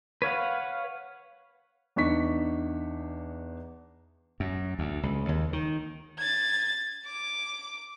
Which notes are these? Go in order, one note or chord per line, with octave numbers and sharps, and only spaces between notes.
B4 C#5 F5 F#5
E2 D4 D#4 C#6 B6
F#2
D2
C#2
D#2
D#3
G#6 A6
D6